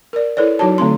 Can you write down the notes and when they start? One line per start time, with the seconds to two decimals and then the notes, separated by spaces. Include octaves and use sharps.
0.13 A#4 D5
0.37 E4 A4 B4 C#5 D5
0.59 F#3 D#4 F#4 C#5 A5
0.78 D3 A3 C4 C6